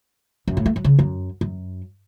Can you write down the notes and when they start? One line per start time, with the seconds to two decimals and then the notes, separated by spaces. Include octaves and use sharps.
0.48 F#2
0.57 A2
0.66 A3
0.76 F#3
0.84 C#3
0.99 F#2
1.41 F#2